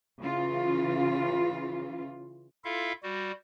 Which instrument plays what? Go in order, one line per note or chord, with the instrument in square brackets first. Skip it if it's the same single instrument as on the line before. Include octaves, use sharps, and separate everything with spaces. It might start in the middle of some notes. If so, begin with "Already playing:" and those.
[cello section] C#3 E3 F4
[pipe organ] E4 F4 A4 E5 F5
G3 F#4